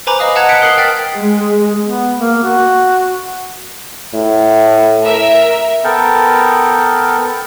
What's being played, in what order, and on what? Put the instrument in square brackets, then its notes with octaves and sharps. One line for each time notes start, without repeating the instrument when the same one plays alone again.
[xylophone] B4 C5 G#5 A#5 B5 D6
D#5 F5 D#6
D#5 F#5 A5 A#5 F#6 G#6
F#6 B6 C#7 D7
A#4 D#6 F#6 C7 F#7
G5 F6 A6 B6
[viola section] G#3
[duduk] B3
A#3
F#4
[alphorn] A2
[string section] A#4 E5
[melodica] B3 A4 A#4 G5